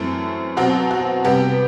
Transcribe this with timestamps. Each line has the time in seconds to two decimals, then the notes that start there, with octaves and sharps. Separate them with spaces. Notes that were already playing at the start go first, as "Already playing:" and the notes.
Already playing: F#2 E3 A3 C4
0.57 B2 F#3 C4 F#4
0.91 F#4
1.25 C3 G3 B3 G4